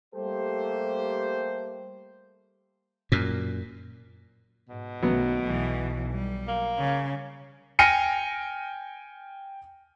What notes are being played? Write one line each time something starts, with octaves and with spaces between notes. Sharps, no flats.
G3 A3 A#3 G4 A4 C5
F#2 A#2
G#2 B2
B1 D#3 F#3 A3 B3
B1 E3
G3
A#3
C#3
G5 G#5 F6 A#6 C#7 D#7